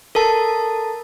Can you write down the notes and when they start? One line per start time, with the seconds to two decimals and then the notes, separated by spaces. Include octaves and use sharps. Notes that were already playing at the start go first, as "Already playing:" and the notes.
0.15 A4 A#4 A5